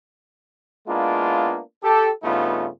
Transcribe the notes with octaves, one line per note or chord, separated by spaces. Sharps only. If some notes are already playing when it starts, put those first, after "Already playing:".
G#3 A#3 B3 D4 E4 F4
G4 A4
G2 C#3 A3 B3 D#4 F4